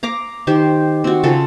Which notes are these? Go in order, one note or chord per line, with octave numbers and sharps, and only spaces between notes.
F5 A#5 D6
D#3 G4 C5
C4 F#4
C#3 F4 A4